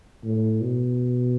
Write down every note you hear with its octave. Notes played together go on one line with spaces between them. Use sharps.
A2
B2